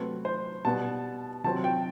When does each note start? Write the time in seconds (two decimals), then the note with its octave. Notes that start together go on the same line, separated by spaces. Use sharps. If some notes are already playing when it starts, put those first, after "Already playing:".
Already playing: C3 F#3 A3 C4 B4
0.25 C5
0.65 B2 G3 B3 A5
1.44 C3 F#3 C4 A5
1.64 G5